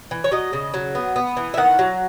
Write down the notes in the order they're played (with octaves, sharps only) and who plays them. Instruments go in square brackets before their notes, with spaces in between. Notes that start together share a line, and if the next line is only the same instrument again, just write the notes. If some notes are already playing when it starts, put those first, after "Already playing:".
[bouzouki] E3
C#5
F#3 D#5
C#3
F#3
B3
B3
E3
E5
D#3 F#5
F#3